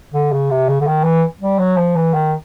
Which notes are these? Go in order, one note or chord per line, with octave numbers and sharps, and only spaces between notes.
D3
C#3
C3
C#3
D3
D#3
E3
G3
F#3
F3
E3
D#3